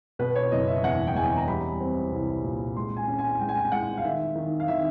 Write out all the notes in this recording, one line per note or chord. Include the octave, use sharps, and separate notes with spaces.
B2 B4
C#5
F#1 D#5
E5
E2 F#5
G5
E2 G#5
A#5
G3 B5
C4
C2
A#2
G#3 C6
G#5
C#4
G#5
G#3 G5
G#5
G5
G#3 F#5
F5
D#3 E5
D#3
F5
D#3 E5